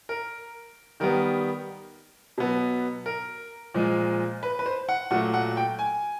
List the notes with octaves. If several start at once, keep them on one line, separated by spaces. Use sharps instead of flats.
A#4
D#3 G3 B3 A#4
B2 F#3 B3
A#4
A#2 F3 G#3
B4
B4
C5
F#5
A#2 F#3 A3 F#5
F#5
G5
G#5